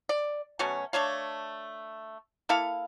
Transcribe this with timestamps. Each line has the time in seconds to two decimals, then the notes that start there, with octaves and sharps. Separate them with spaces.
0.09 D5
0.59 B2 F#3 A3 C#4
0.93 A3 D4 C#5 F5
2.49 A#3 E4 A4 F5